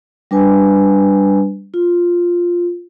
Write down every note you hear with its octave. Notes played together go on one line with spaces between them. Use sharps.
G3 D4 B4 G#5
F4